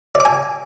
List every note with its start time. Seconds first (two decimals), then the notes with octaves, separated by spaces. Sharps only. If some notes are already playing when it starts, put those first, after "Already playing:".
0.15 D5
0.20 D6
0.25 G#5